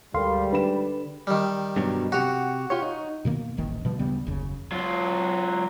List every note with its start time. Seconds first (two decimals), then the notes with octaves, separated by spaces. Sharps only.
0.14 D2 G#2 G3 A4 A#4 F5 C6
0.52 D3 B4 B5 E7
1.27 D#3 G3
1.76 G2 B2 F#3
2.12 C3 F#4 G4 F#5
2.70 F4 G4 C#5
2.82 D#4
3.25 B2 D#3 A#3 B3
3.57 D#1 A1 D#3 A#3
3.85 B2 F3 G3
3.99 D2 C#3 G3 B3
4.27 F#1 D#2 C#3
4.72 F#3 F4